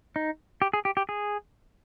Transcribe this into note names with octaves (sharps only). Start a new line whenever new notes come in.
D#4
G4
G#4
G4
G4
G#4